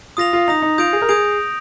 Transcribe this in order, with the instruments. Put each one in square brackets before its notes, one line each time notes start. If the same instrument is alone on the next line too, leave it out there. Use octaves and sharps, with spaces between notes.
[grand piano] F4 [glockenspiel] D#6 A#6 F7
[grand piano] F4
[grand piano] D#4 [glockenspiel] D#6 A#6 F7
[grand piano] D#4
[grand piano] F4 [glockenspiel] D#6 G6 D7 F7
[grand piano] G#4
A#4
[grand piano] G#4 [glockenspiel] D#6 G6 D7 F7